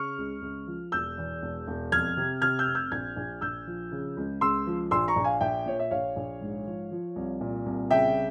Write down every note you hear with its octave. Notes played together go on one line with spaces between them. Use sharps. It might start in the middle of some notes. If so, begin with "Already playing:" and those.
Already playing: C#3 C#6 F6
C#2
C#2
F3
E1 E6 G6
E2
E1
E1
F2 F6 G#6
C3
C3 F6 G#6
E6 G6
F1
E6 G6
A#1 F6 G#6
A#1
A#1 E6 G6
F3
C#3
C#2
C#2 C6 E6
F3
A#1 C6 E6
A#5 C#6
A#1
F5 G#5
A#1 E5 G5
A#2 C#5
E5
A#1 C#5 F5
A#1
G#2
F3
F3
C2
A#2
C2
C#3 E5 G5